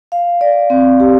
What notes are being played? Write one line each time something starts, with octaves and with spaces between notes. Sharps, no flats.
F5
D5
C4
G4